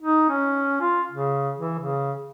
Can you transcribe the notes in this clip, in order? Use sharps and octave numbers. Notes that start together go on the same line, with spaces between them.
D#4
C#4
F4
C#3
E3
C#3